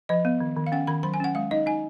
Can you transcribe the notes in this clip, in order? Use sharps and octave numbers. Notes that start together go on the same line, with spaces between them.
F3 D#5
B3
D#3
D#3
F5
C#4 F#5
D#3 B5
F#3 B5
G#5
C#4 F#5
G#3 F5
D#4 D#5
D#4 G#5